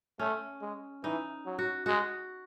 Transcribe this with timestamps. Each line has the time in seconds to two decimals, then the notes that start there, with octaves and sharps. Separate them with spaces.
0.19 A3 C#4
0.61 G#3
1.04 E3 D#4
1.45 F#3
1.59 F#4
1.86 G#3 F#4